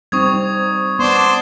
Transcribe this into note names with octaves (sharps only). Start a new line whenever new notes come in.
G3 C4 D#4 C#6 D#6 G#6
B3 D4 C5